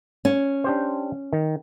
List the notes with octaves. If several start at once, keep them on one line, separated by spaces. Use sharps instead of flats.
C#4
D4 G4 C5
D#3